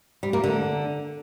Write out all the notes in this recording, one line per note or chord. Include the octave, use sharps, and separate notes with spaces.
G3
A#3
D3